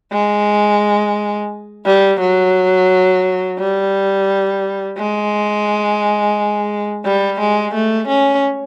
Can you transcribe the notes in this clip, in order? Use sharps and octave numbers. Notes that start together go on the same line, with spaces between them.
G#3
G3
F#3
G3
G#3
G3
G#3
A3
C#4